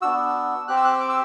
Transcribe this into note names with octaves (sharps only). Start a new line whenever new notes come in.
B3 D4 F#4 E6
C4 G4 F#6
E6
F#6
E6
D6
E6